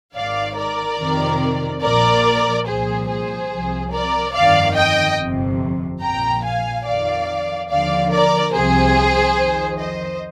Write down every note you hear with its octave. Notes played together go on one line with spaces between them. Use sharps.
G#1 G#2 D#3 D5 F5
A#4 D5
F2 C3 D#3
A#1 A#2 F3 A#4 D5
C2 A#2 F3 G#4 C5
G#4 C5
C2 C3 F3
A#4 D5
G1 F2 D#3 D5 F5
D#5 G5
G1 F2 C3
A#1 A#2 F3 G5 A#5
F5 G#5
F2 D#3 D5 F5
D#2 D3 F3 D5 F5
A#4 D5
C2 C3 F3 G#4 C5
F2 D#3
C5 D#5